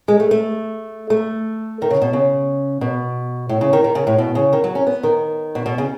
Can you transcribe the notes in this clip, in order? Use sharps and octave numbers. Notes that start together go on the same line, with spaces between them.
G#3
A3
A3
A3
D#3
C#3
B2
C#3
B2
A2
C#3
D#3
D#3
C#3
A2
B2
C#3
D#3
F#3
C#4
B3
D#3
B2
B2
C#3